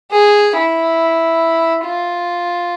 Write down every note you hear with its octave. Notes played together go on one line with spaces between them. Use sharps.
G#4
E4
F4